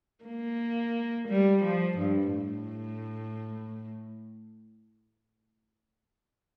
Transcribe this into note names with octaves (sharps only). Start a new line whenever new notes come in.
A#3
G3
F3
G2
A2